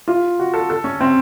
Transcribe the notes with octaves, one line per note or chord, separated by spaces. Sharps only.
F4
F#4
A4
A4
C#4
C4